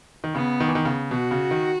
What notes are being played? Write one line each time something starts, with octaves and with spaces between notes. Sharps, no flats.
D#3
C#3 B3
D#3
E3
D#3
C#3
B2 F#4
C#3
D#3